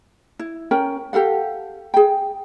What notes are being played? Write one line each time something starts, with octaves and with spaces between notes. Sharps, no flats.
E4
C#4 A#4 G5
G4 A4 F5 F#5
G#4 G5